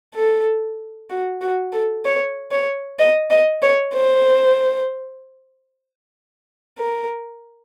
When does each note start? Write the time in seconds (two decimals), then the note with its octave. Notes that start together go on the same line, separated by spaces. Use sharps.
0.15 A4
1.10 F#4
1.41 F#4
1.72 A4
2.05 C#5
2.51 C#5
2.99 D#5
3.30 D#5
3.62 C#5
3.94 C5
6.78 A#4